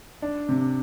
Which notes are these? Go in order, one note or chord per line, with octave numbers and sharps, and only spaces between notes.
D4
C3